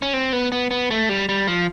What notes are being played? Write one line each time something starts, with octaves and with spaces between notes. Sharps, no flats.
C#4
C4
B3
B3
B3
A3
G3
G3
F3